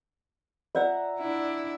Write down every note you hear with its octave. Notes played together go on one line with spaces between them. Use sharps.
F4 D5 E5 F#5 A#5 E6
D4 E4